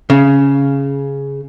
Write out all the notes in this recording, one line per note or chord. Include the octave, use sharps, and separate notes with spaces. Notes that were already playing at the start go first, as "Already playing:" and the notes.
C#3